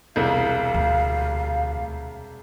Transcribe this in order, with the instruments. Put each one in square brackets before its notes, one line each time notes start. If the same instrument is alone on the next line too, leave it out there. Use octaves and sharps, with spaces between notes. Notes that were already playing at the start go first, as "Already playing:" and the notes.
[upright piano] E1 C2 [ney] F5
[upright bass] D2